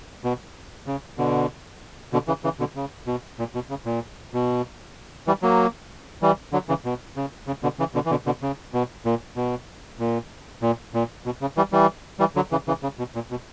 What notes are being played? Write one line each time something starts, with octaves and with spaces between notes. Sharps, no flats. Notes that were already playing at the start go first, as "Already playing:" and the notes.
B2
C#3
B2 D3
B2 D3
C#3 E3
C#3 E3
B2 D3
C#3
B2
A#2
B2
C#3
A#2
B2
E3 G3
F#3 A#3
E3 G3
D3 F#3
C#3 E3
B2
C#3
C#3
B2 D3
C#3 E3
B2 D3
E3
B2 D3
B2 D3
C#3
B2
A#2
B2
A#2
A#2
A#2
B2
C#3
E3 G3
E3 G3
E3 G3
D3 F#3
C#3 E3
C#3 E3
C#3
B2
A#2
B2